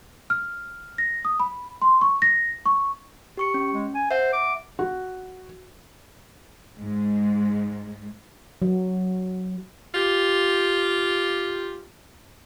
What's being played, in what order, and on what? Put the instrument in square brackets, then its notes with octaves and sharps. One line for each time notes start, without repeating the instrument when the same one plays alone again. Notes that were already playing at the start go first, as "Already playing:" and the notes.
[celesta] F6
A#6
D#6
B5
C6
C#6
A#6
C#6
[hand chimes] G4 C#6 C#7
C#4
[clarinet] G#3
G#5
[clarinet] C5 [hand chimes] E5 F#5
[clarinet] D6
[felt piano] F#4
[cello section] G#2 G#3
[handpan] F#3
[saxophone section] F4 G4